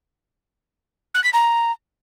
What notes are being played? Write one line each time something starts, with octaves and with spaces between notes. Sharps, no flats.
F#6
B6
A#5